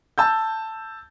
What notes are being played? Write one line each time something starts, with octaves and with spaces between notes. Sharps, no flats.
A5 E6 G6